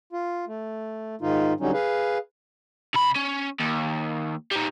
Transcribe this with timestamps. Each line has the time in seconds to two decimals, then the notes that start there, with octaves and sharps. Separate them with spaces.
0.13 F4
0.47 A3
1.21 G#2 D#3 D#4 F4
1.60 D3 F#3 G3 C#4 D#4
1.73 G#4 B4 F5
2.94 C3 B5
3.16 C#4
3.59 D#2
4.51 G3 D#4